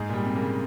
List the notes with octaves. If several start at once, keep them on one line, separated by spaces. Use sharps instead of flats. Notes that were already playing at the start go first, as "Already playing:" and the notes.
Already playing: G#2 G#4
A#2 G3
C3
A#3
C#3